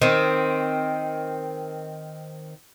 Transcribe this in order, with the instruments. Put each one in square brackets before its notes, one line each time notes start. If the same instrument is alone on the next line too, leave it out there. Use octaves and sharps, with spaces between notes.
[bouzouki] D#3 C4